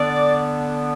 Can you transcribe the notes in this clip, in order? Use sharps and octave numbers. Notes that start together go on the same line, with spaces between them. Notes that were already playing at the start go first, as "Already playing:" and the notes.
Already playing: D3 B3 D4 D5